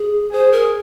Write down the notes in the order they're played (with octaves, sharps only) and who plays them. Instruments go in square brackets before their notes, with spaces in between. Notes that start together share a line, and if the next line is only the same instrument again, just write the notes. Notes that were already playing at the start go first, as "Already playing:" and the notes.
Already playing: [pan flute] G#4
[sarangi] G#4 [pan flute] C5
[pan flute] A#4